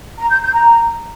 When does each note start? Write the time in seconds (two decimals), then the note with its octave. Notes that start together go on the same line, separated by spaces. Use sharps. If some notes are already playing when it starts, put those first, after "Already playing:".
0.18 A#5
0.30 G6
0.42 G6
0.54 A#5